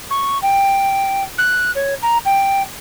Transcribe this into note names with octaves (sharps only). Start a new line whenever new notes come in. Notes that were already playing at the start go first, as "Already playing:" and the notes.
C#6
G5
F#6
C#5
A#5
G5